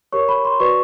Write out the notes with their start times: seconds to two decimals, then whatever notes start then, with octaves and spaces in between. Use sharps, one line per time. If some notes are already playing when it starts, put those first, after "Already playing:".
0.12 G4 A#4 C#5 C#6
0.29 B5
0.45 C6
0.60 F#4 B4 D5 C#6